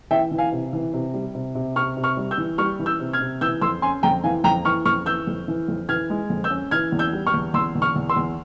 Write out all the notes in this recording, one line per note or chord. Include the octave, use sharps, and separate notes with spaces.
E3 E5 G5
E3
F5 G#5
C3
E3
C3
G3
C3
C3
C3 C#6 F6
C3
C#6 F6
G3
E6 G6
E3
G3 C#6 F6
E3
E6 G6
C3
F6 G#6
C3
E3 E6 G6
F2 C6 E6
C#4 G#5 C6
F2 G5 A#5
E3 F5 G#5
F2 G5 A#5
E3 C#6 F6
F2 C#6 F6
E3 E6 G6
F2
E3
F2
E3 F6 G#6
G#3
F2
E6 G6
C#4
E3 F6 G#6
E2
E6 G6
G3
C#6 F6
E2
E2 C6 E6
E2
C#6 F6
E2
C6 E6
E2